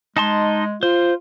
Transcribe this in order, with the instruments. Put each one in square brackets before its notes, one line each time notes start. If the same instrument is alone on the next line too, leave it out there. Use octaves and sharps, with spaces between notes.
[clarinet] G#3 [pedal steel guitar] D#4 A5 C6
[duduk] F4 [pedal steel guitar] C5